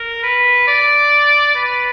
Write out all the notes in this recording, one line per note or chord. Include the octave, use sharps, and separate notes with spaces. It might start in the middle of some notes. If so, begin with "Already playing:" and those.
Already playing: A#4
B4
D5
B4